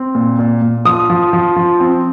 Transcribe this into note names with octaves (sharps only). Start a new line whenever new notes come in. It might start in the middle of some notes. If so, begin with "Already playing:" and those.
Already playing: C4
A#2
A#2
A#2
F3 D#6
F3
F3
F3
C4